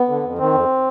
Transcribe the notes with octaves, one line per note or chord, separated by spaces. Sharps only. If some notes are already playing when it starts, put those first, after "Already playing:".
Already playing: B3
D3
F2
D#3 C4
F2